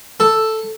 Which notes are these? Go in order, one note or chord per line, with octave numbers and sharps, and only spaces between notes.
A4